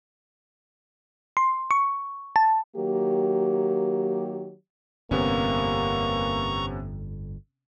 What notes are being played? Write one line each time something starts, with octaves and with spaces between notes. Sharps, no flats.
C6
C#6
A5
D#3 F#3 A#3 G4
G1 F2 C3 A#3 B3 C#4 A#5 C#6